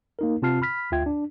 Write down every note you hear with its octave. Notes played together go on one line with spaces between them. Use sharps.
A#3 D#4 A#4
C3 C4 F4 A5 F6 C7
B5 F6 B6
D2 F4 E5 G5 G#6
D4